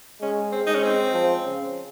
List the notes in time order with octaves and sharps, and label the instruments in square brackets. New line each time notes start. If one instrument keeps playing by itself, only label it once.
[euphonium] G#3 [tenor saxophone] C#4
[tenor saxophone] C4
[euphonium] G#3 [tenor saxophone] D#4
[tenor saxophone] C#4
C4
[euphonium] F3
C#3